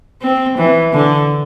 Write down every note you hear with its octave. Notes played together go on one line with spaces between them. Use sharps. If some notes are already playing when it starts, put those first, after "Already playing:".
C4
E3
D3